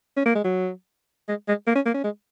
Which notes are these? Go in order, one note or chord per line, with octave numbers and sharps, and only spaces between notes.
C#4
A#3
G#3
F#3
G#3
G#3
A#3
C#4
A#3
C#4
G#3